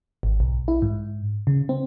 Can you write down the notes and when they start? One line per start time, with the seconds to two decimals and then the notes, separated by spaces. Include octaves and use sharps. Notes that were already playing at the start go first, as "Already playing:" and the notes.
0.23 G#1
0.40 B1
0.68 E4
0.82 G#2
1.47 C#3
1.69 C4